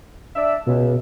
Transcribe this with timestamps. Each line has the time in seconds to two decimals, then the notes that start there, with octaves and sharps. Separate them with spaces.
0.35 D4 D5 E5
0.67 C#2 B2